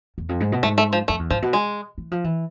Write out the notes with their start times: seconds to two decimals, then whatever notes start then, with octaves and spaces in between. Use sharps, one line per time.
0.18 E2
0.29 F2
0.40 G#2
0.52 B2
0.63 G#2 A3
0.78 A3
0.93 F3
1.08 F2 A3
1.19 E2
1.30 G#2 F3
1.42 B2
1.53 G#3
1.98 E3
2.12 F3
2.24 E3